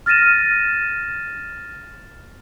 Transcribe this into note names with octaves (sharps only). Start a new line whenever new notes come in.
F6 A6 A#6 D#7 E7